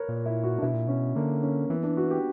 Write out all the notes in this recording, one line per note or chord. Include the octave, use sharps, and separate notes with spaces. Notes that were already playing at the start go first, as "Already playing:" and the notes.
Already playing: A#4 B4 C#5
A#2
E4
F#4
D4
B2 E4
A#2
B2 C#4
D3 A#3
C#4
E3 B3
D4
F#4
G4